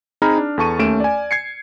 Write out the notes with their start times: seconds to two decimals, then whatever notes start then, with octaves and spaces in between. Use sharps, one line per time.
0.22 C4 D#4 G#4 A#5 B5 F6
0.38 D4
0.58 E2 A4 A5 C#6 D#7
0.79 D#2 A3 C#4 D7 E7
1.00 D5 G#5
1.31 G#6 C7 C#7